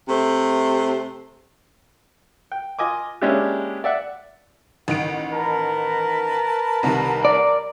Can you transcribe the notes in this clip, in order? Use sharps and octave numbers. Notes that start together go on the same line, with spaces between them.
C3 A3 C5
G5
F4 D#5 G#5 D6
G#3 A#3 C#4 D4 E4 G4
D5 E5 F#5
A1 D#3 F#5 D7
A#4 B4 A5 B5
C2 C3 D#3
D5